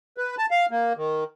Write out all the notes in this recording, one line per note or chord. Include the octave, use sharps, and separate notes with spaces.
B4
A5
F5
A#3
D#3